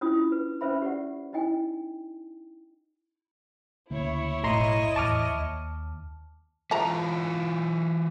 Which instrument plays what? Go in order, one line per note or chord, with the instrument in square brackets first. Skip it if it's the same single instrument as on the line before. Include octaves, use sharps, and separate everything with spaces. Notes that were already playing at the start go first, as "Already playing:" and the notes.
[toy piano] C#4 D4 E4 F4 D#6
B4
C#4 B4 C5 E5 B5
G4 D5 F#5
D#4 E4 D#5 G5 G#5
[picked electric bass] D2 C#3 A#3 [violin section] E4 C#5
[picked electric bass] F#1 B1 [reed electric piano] A2 A#5 C6 [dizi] D#5
[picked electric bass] E2 A2 E3 [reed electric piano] A5 D6 F6
[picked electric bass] D#2
[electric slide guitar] E3 F4 B4 [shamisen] A5 A#5